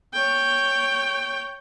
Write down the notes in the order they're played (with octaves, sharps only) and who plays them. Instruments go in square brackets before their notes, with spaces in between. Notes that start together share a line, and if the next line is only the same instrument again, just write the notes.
[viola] C#5 G5